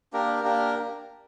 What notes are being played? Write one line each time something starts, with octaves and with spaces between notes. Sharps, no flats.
A#3 D4 G4 A#4
A#3 D4 G4 A#4